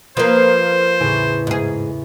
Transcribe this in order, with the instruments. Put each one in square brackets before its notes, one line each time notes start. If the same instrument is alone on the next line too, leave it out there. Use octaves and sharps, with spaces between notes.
[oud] F3 A#3 [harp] B4 C6 D#6 [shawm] C5
[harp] E2 A2 C#3
[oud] G#2 G#4